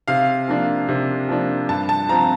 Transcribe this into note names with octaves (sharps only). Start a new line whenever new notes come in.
C3 F5
F3 A#3 D4
C3
F3 A#3 D4
G2 A5
A5
F3 C4 A#5